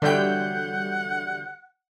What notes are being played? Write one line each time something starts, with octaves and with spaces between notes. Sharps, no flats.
E2 D3 F#3 G3 F#5 G5 G6